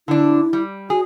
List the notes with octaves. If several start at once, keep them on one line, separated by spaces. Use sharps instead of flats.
D3 D4 E4
G3
F#4 G#4